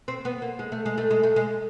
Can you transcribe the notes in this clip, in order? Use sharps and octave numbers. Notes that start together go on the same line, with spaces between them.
C4
B3
A#3
G#3
A3
G#3
A3
G#3
A3
G#3